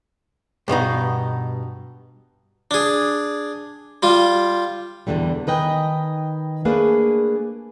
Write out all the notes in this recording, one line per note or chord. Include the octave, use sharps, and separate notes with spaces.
G2 B2 B3 D#4
D4 G#4
G3 F4
E2 A#2 D3 E3 G3
D#3 B4 D#5 G5 G#5
A3 A#3 D4 G#4 B4